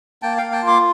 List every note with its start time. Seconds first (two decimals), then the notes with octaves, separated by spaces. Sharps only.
0.22 A#3 G5 A5
0.37 A#3 F5 G5
0.52 G5 A5
0.62 F4
0.68 C6 D6